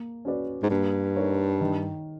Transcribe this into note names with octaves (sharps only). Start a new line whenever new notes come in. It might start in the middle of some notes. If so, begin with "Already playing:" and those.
Already playing: A#3
C#4 F#4 B4 D5
G#2
G2 A#3
D#4 G4 A#4 C#5
D#3